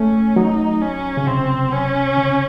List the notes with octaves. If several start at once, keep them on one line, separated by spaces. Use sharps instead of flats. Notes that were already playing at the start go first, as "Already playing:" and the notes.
Already playing: A3 C#4
F#3 D#4
C#4
C#3
C3 C4
C#4
C#3